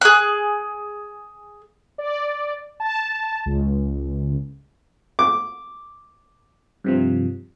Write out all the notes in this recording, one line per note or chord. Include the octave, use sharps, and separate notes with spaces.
G#4 F#6
D5
A5
C#2
D6
G2 C3 F3